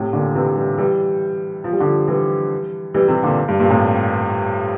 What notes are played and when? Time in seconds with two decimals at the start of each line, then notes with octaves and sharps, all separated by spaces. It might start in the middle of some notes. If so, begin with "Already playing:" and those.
Already playing: A2 C3
0.13 A#2 D3
0.35 C3 E3
0.56 E3 G3
0.78 E3 G3
1.64 F3
1.72 G3
1.80 D3 F3
2.08 E3 G3
2.94 E3 G3
3.08 C3 E3
3.23 A#2 D3
3.48 G2
3.60 G2 A#2
3.70 A2 C3